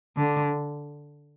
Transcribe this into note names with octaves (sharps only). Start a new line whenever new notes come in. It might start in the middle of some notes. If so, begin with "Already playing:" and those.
D3